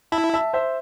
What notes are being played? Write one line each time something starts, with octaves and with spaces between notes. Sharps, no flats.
E4 E5 A5
E5 A5
C5 E5